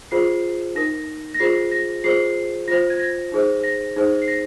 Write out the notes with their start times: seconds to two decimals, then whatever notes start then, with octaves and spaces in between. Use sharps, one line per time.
0.11 F4 G#4 C5 C7
0.75 D#4 A#4 A#6
1.34 A#6
1.40 F4 G#4 C5 C7
1.71 A#6
2.04 F4 G#4 C5 C7
2.68 F4 C5 A#6
2.90 G#6
3.00 A#6
3.32 D#4 G#4 C5
3.64 A#6
3.96 D#4 G#4 C5
4.22 C7
4.28 A#6